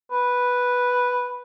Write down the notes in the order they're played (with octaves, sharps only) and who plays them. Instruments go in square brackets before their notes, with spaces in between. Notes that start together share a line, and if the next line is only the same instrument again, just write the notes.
[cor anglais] B4